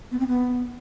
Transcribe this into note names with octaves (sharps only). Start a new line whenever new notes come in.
B3
C4
B3